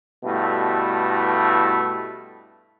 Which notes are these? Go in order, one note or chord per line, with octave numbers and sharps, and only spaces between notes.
G2 B2 A3 E4